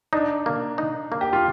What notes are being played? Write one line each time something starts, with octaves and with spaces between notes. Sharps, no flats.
D4 D#4
A#3
D#4
A#3
G4
F4